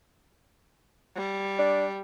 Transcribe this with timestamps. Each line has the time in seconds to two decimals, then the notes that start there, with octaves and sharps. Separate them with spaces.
1.16 G3
1.58 D4